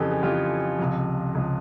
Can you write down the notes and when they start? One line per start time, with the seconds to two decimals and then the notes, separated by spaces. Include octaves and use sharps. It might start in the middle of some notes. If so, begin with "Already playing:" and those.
Already playing: F2 C#3 E3 G4 A4
0.11 G#4
0.23 F2 C#3 E3 F4 G4
0.79 C#2 C3 F3
1.35 C#2 C3 F3